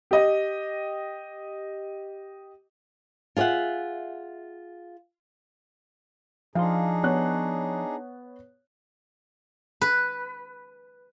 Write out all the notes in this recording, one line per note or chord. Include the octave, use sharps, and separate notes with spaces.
G4 D#5
F4 G#4 D5 E5 F#5
F3 D4 D#4 G#4 F5 C6
B3 C#5 F#6
B4